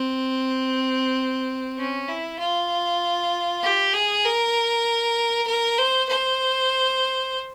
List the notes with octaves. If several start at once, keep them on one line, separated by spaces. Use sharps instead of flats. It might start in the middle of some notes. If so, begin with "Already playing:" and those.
Already playing: C4
C#4
E4
F4
G4
G#4
A#4
A#4
C5
C5